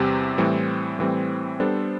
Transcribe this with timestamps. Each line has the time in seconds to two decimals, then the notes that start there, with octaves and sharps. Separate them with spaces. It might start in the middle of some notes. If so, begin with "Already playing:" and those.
Already playing: E2 C3 G3 C4 G4
0.38 A2 E3 G3 C4
0.99 A2 E3 G3 C4
1.60 G3 B3 D4 A4 C5